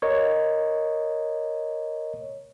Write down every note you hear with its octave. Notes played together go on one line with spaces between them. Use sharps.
A#4 C#5 D#5